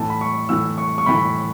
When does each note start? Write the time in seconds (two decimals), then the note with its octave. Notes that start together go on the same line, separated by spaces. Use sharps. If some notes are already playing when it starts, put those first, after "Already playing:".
Already playing: A2 E3 A5
0.10 B5
0.21 C#6
0.49 A2 E3 E6
0.78 C#6
0.98 C#6
1.06 A2 E3 B5